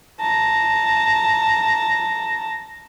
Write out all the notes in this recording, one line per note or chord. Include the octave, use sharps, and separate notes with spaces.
A5 A#5